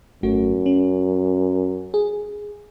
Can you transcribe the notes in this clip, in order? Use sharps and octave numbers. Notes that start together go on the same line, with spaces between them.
G#1 F#2 A3 F#4
C#4
G#4